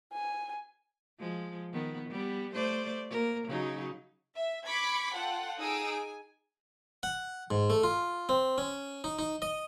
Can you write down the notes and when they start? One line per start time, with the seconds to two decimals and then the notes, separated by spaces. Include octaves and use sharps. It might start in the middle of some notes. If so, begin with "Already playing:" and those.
0.13 G#5
1.19 F3 G#3
1.73 D#3 B3
2.10 G3 B3
2.54 A3 C5 D5
3.10 A#3 A#4
3.47 C#3 F#3 D#4
4.36 E5
4.68 B5 C#6 D6 G#6 B6 C#7
5.15 F4 A4 F#5 G5
5.60 D#4 G#4 G#5 D#6 E6 D7
5.92 G#5
7.03 F#5
7.51 G#2
7.70 A3
7.83 F4
8.29 C4
8.58 C#4
9.04 D#4
9.19 D#4
9.42 D#5